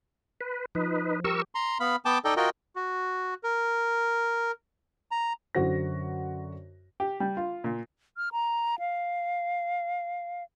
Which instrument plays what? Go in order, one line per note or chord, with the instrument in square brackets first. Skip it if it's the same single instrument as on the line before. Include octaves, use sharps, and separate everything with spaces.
[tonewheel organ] B4
[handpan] F3 [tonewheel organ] D#4 B4
[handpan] G4 [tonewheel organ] A#4 C#6 E6
[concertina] A#5 C6
B3 F5 B5
B3 G5 A5 D6
D#4 A4 D5 D#5 G5
F4 F#4 A#4 D#5 G5
F#4
A#4
A#5
[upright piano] F#2 D3 F#4 C5 A#6
[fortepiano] G4
G3
F4
A#2
[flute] F6
A#5
F5